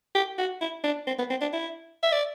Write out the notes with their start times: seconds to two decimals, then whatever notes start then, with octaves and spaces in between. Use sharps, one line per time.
0.15 G4
0.38 F#4
0.61 E4
0.84 D4
1.07 C4
1.19 B3
1.30 C4
1.41 D4
1.53 E4
2.03 E5
2.12 D5